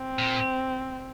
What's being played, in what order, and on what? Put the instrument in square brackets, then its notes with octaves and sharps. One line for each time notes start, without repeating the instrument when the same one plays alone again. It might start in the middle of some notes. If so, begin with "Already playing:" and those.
Already playing: [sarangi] C4
[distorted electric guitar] A#2